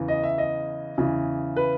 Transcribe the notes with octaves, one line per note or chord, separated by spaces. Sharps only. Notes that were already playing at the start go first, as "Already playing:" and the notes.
Already playing: E2 C#3 E3
D#5
E5
D#5
E2 C#3 E3
B4